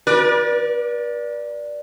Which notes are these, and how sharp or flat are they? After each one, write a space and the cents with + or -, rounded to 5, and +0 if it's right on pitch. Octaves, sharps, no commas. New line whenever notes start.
B4 -45 D5 +0